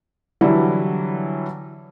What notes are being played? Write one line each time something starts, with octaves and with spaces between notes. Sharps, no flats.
D3 E3 F#3 G3 E4